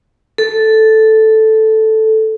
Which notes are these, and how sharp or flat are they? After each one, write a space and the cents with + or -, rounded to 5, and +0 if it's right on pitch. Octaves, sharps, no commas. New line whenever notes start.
A4 -5